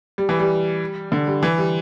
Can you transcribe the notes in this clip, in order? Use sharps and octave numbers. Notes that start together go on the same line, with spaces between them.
G3
E3
G3
D3
G3
E3
G3